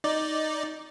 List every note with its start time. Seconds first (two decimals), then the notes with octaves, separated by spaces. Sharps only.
0.04 D#4 D5